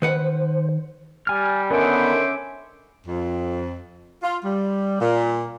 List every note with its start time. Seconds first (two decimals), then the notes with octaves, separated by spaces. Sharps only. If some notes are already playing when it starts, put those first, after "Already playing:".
0.02 D#3 B4 C5 F#5
1.27 G3 G#5 F6
1.71 D3 D#3 B3 C#4 C5 E5 D6
3.06 F2
4.23 F4
4.45 G3
5.01 A#2